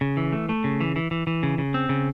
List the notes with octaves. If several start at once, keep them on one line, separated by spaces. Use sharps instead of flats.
C#3
E3
A3
A3
C#3
E3
E3
E3
E3
C#3
C#3
C4
C#3